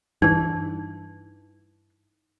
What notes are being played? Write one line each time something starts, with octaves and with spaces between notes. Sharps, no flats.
G2 E3 D#4